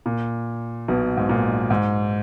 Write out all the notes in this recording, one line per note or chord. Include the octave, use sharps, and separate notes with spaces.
A#2
B1 B2
G#2
A#2
G#2